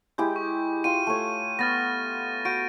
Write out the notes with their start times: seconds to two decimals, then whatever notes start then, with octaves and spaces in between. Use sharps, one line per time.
0.18 G#3 E4 G4 G6
0.36 C#6
0.84 F4 G5 D#7
1.07 A3 C#5
1.59 B3 F6 A6 A#6
2.45 F#4 G6 D7 D#7